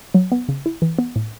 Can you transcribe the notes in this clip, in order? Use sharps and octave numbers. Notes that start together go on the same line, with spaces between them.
F#3
B3
C#3
E4
E3
B3
A2